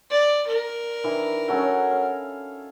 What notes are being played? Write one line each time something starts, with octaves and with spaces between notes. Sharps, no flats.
D5
A#4
D#3 E3 D4
F#3 C#4 A4
F5